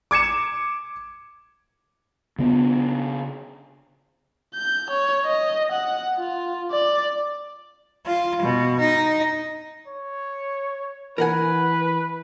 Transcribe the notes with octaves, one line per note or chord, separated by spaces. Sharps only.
D6 G#6 C#7 E7
C#3 B3 C4 D4
G6
C#5
D#5
F#5
F4
D5
F4
B2
D#4
C#5
E3 A#4 B4 F#5 G#5